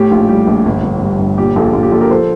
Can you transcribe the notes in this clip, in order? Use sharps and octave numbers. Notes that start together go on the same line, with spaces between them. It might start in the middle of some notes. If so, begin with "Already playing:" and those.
Already playing: A2 G4
A#1 F4
G3 G4
A#1
G1
G1
G2
G1
A#2 G4
A#1 F4 A4
A#2 F4
G4
A#1 F4 A4
G4 A#4
F3 A4 C5